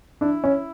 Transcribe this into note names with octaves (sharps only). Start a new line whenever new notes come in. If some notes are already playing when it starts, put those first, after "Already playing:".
D4 E4
C#4